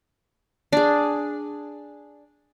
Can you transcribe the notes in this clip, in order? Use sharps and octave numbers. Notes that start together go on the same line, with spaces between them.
D4 G#4